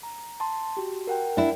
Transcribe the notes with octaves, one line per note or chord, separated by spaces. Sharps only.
A#5
A5 C6
F#4 G4
A#4 F#5 G5
D4 E4